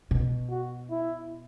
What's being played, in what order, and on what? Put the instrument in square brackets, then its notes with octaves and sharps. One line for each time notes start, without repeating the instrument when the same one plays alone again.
[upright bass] B2
[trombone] F#4
E4